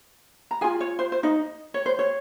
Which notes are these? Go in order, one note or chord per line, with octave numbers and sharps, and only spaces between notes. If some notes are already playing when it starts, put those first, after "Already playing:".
A#5
F4 G#4 G#5
C#5
C5
C5
D#4 D#5
C#5
C5
C#5